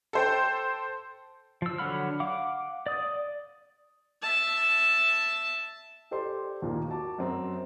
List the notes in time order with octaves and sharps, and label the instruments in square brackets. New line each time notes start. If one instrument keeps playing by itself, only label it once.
[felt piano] A4 C5 G5
[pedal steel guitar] F3 E6
D3 F#3 F#5 B5 F6
F5 F#5 D6
D5 D#6
[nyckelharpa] E5 A5
[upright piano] G4 A4 C5 D5 C6
D#2 A#2 A#3
F#4 A5 D6
F#2 C4 A#5